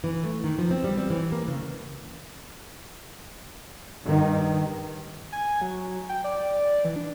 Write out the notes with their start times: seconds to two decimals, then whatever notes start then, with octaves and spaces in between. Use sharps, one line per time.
0.04 E3
0.24 A3
0.44 D#3
0.59 F3
0.71 C4
0.84 G3
0.97 C4
1.10 E3
1.32 A#3
1.48 C#3
4.05 G2 D#3
5.32 G#5
5.61 F#3
6.09 G5
6.24 D5
6.85 E3
6.96 D4